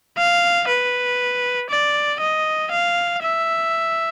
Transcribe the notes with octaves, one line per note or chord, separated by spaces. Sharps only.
F5
B4
D5
D#5
F5
E5